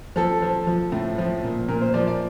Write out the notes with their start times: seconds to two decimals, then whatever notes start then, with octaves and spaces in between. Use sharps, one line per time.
0.16 F3 A4
0.42 F3
0.67 F3
0.92 A2
1.18 F3
1.44 A#2
1.68 A#2 A#4
1.82 C5
1.94 F3 D5
2.07 D5